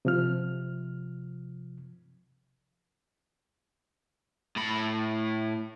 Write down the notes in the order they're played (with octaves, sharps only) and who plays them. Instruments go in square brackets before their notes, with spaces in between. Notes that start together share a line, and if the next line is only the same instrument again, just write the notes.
[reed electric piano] C3 F3 F6
[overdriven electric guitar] A2 B5